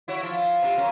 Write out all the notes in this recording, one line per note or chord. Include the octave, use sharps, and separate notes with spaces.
E4 F#4 C#5
F3 F4
C3 F4
F#2 C#4